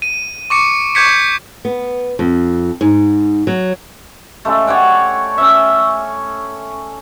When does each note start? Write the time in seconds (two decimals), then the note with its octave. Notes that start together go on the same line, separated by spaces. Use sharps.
0.02 D#7
0.50 C#6 D6 C#7
0.95 C#6 D6 G6 G#6 B6 C#7
1.65 B3
2.19 F2
2.81 G#2
3.47 F#3
4.45 C#3 G#3 A3
4.67 C#5 D5 F#5 G5
5.38 C#4 E5